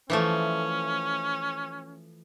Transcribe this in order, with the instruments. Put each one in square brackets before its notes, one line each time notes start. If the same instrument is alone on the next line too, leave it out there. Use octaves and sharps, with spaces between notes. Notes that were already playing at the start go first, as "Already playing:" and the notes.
[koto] E3 F3 A3 [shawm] C#4